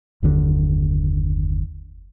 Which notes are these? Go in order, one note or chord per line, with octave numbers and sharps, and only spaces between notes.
F#1 D#2 D3